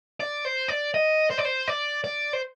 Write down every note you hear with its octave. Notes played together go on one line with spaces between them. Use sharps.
D5
C5
D5
D#5
C5
D5
C5
D5
D5
C5